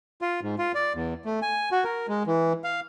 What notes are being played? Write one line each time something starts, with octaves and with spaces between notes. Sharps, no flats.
F4
G#2
F4
D5
E2
A3
G#5
F#4
A#4
G#3
E3
F5